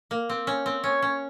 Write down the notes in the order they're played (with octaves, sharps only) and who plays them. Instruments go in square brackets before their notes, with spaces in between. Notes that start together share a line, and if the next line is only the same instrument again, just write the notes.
[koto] A#3
C4
C#4
C4
[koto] C#4 [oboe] C#5
[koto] C#4